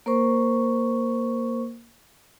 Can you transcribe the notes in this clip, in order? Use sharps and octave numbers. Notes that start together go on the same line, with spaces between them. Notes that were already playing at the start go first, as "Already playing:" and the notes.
A#3 A#4 C5 C#6